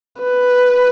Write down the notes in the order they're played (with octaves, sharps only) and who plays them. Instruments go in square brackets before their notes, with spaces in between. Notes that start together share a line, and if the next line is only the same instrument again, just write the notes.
[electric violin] B4